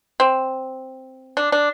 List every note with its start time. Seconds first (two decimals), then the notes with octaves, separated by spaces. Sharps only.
0.20 C4
1.37 D4
1.52 D4